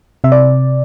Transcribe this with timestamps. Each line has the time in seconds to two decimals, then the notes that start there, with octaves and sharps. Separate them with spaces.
0.24 C3 E5
0.32 D5